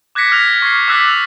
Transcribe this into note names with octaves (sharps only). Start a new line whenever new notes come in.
D6 F#6 G#6 A#6 B6 C#7
F6 G#6 A#6 F7
C#6 F6 G#6 C7
D6 E6 F#6 A6 B6
F7